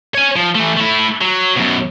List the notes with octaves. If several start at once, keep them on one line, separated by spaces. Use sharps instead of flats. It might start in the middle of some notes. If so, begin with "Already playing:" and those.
C#5 G#5
F3
E3 A3
A3 E4
F#3
F#2 B2